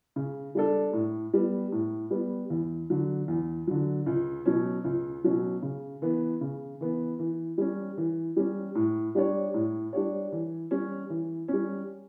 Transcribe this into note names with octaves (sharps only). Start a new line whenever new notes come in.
C#3
G3 D4 A4
A2
G3 B3
A2
G3 B3
E2
D3 F#3
E2
D3 F#3
C#2
B2 F#3 C#4
C#2
B2 F#3 C#4
C#3
E3 B3
C#3
E3 B3
E3
G3 C#4
E3
G3 C#4
A2
G3 D4 G4 C#5
A2
G3 D4 G4 C#5
E3
G3 C#4
E3
G3 C#4